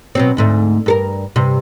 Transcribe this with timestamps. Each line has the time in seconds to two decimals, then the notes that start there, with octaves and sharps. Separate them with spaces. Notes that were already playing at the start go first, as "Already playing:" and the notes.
0.15 B2 F#3 C4
0.37 D2 G#2 A3
0.86 G2 A4 A#4
1.36 G2 C3